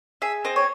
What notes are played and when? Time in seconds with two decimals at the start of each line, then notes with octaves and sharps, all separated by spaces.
0.22 G#4 E5
0.45 C4 D#5
0.56 C#5